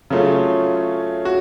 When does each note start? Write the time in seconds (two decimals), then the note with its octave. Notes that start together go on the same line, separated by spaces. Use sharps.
0.10 C#3 F#3 A3 C#4 F4
1.25 F#4